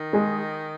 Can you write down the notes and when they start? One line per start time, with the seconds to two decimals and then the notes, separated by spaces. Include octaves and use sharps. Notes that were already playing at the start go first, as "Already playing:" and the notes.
Already playing: D#3
0.13 G#3 G#4